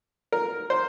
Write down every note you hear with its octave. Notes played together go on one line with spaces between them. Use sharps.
A#4
C5